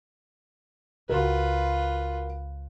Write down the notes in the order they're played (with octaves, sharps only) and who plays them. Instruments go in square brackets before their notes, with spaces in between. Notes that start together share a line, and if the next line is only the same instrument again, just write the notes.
[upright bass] C#2 [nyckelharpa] F4 B4 [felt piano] F#4 A#4